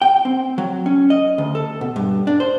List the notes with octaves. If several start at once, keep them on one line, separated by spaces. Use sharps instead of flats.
G5
C4
F#3
C#4
D#5
D2
A4
B2
G2
D4
C5